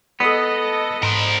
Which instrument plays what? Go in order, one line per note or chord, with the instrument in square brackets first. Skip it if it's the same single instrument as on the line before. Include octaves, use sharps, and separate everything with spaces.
[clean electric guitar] B3 [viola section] A4 D#5 [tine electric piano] B5 D#6
[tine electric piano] G#2 [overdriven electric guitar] A#4 C5